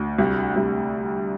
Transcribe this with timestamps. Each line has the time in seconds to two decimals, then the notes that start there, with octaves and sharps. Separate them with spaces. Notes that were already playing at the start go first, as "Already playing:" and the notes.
Already playing: D2
0.18 C2
0.56 C2